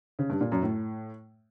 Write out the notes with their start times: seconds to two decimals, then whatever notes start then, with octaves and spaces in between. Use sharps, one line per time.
0.19 C#3
0.30 G2
0.41 A#2
0.52 F#2
0.63 A2